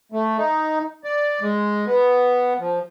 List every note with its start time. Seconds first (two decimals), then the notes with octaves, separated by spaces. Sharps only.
0.12 A3
0.38 D#4
1.04 D5
1.41 G#3
1.86 B3
2.59 F3